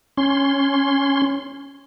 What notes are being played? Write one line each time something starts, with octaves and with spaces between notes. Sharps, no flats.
C#4 C6